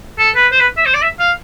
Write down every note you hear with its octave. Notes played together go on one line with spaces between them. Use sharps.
A4
B4
C5
B4
E5
C5
D5
E5
F5